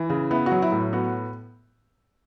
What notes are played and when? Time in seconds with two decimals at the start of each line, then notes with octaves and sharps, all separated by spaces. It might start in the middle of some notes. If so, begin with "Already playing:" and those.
Already playing: E3
0.10 C#3
0.31 B3 E4
0.46 F#4
0.52 F#3
0.62 E4
0.72 A2
0.93 B3 F#4